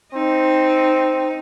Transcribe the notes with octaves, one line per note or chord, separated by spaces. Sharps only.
C4 D#4